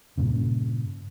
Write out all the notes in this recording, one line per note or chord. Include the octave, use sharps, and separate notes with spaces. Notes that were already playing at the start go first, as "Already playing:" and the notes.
G2 A#2 C#3